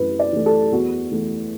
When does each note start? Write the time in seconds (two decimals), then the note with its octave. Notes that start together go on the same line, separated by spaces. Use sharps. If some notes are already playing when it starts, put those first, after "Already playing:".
Already playing: F#2 E3 A3 B4
0.19 D5
0.32 E3 A3
0.46 A4
0.72 E2 F#4
1.11 E3 A3